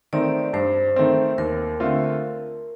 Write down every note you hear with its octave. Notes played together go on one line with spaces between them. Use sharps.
D#3 A3 C4 D5
G2 C5
D#3 A3 C4
D#2 A#4
D3 A3 C4 F4